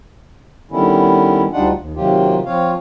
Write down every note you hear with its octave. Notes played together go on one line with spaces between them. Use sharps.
D3 D#3 G3 B3 C#4 E4
D2 G3 D4 D#4 F4 F#5
D#2
C3 D#3 F#3 A#3 F4 G4
F3 C4 F4 C#5 F5